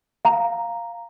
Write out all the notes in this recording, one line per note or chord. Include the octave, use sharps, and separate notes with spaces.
F5 A#5